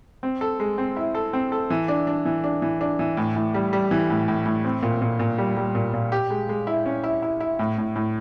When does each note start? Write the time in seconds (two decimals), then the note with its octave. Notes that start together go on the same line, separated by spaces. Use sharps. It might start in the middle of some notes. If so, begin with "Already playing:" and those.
0.23 C4
0.41 A4
0.60 G#3
0.78 C4
0.96 E4
1.15 A4
1.33 C4
1.52 A4
1.70 E3
1.88 D4
2.07 D4
2.25 E3
2.44 D4
2.62 E3
2.81 D4
2.99 E3
3.17 A2
3.36 A2
3.54 G3
3.73 G3
3.91 E3
4.10 A2
4.28 A2
4.46 A2
4.65 C4
4.83 A#2
5.02 A#2
5.19 A#2
5.38 G3
5.57 G3
5.75 A#2
5.94 A#2
6.12 G4
6.30 G#3
6.49 G#3
6.67 E4
6.86 C#4
7.04 E4
7.22 E4
7.40 E4
7.59 A2
7.78 A2
7.96 A2